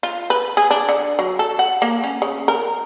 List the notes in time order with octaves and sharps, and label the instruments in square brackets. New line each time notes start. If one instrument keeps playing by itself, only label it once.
[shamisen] F4
B4
G#4
D4
D3
F#3
A4
F#5
A#3
C#4
C#3
A#4